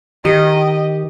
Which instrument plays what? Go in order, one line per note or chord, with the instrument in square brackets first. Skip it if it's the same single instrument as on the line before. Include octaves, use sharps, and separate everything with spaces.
[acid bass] D#3 [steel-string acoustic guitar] G4 [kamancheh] D#5